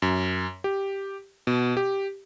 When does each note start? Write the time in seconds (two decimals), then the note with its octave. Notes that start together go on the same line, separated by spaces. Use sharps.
0.02 F#2
0.64 G4
1.47 B2
1.77 G4